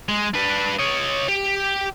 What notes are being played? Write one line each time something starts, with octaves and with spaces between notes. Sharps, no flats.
G#3
D4 B4
C#5 D#5
G4